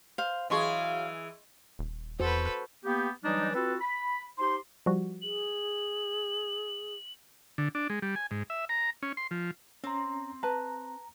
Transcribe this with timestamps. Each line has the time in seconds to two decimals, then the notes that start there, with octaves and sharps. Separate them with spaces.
0.18 C5 F5
0.50 E3 F#3 G#4 D#5 F5 C6 C#6
1.79 D#1
2.20 E2 F#4 A4 B4 C5
2.84 A#3 B3 G4
3.23 E3 F#3 G3 D4 D#4
3.54 C4 F4 F#4 A4 B4
3.80 B5
4.39 D#4 G4 C5 C6
4.86 F3 G3 F#4
5.22 G#4 F#7
7.58 D3
7.75 D4
7.90 G#3
8.02 G3
8.16 G#5
8.31 G#2
8.50 E5
8.69 A#5
9.03 C#4
9.17 C6
9.31 F3
9.84 C4 C#4 A#5
10.43 B4 A5 A#5